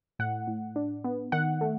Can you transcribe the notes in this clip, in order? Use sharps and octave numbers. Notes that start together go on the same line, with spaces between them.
A2 F#5
A2
D4
B3
D#3 F#5
A3